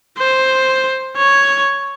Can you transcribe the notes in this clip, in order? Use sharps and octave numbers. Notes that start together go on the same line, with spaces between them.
C5
C#5